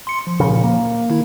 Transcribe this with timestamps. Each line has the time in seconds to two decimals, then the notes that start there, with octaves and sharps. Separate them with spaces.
0.07 C6 C#7
0.27 F3
0.40 A#2 C#3
0.63 A#3
1.10 D#3 E4